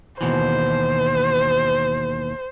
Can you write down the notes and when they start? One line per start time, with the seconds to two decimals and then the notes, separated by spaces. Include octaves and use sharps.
0.21 D#2 B2 E3 C5